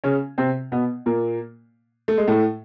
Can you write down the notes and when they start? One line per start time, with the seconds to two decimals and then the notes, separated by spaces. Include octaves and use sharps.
0.04 C#3 C#4
0.38 C3 C4
0.72 B2 B3
1.06 A#2 A#3
2.08 A3
2.18 G#3
2.28 A2 A3